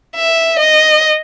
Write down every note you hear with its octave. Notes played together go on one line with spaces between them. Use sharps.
E5
D#5